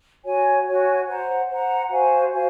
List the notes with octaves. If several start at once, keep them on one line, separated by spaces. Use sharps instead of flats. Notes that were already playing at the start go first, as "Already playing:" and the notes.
F#4 C#5 G#5
F#4 C#5 G#5
C5 F#5 A#5
C5 F#5 A#5
F#4 C5 F5 G#5
F#4 C5 F5 G#5